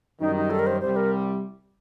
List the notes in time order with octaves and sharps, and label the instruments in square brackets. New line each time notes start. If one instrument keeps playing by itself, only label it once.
[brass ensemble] F#2 D#3 G3 [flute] D#4
[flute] D#4
A4
A#4
C5
[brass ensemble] C2 C3 G3 [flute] C5
[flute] A#4